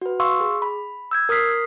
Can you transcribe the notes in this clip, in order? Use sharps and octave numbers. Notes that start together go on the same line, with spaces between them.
F#4 B4
F5 C6 C#6 E6
G#4
B5
E6 G6 G#6
A#4 D#6 F6 B6 C7